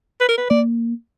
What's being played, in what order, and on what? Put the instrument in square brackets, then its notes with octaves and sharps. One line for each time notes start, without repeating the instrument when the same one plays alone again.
[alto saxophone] B4
A#4
B4
[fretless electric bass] A#3 [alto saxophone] D5